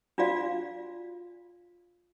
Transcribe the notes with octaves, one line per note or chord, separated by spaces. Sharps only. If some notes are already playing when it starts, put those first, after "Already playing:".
D4 F4 F#4 D5 F5